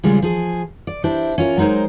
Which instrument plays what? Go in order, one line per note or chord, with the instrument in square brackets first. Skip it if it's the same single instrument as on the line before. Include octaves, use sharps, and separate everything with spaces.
[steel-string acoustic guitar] C#3 G3 G#3 F4
F3 G#4
D5
D4 E4 G4 C5
C#4 F4 A#4
F#3 G#3 D#4 A#4 C5